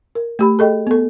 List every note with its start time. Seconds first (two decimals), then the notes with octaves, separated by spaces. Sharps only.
0.15 A#4
0.39 A3 G4 B5
0.59 G#4 A4 D#5 G5
0.87 B3 A4